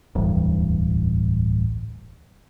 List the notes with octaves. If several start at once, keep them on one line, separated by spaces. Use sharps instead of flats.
D1 A1 E2 G2